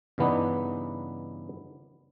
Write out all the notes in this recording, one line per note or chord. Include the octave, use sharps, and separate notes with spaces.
G2 C#3 E3 B3 D4 D#4